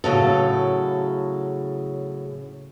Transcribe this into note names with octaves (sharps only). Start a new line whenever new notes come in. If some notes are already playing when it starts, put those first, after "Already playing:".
A2 C#3 F#3 A4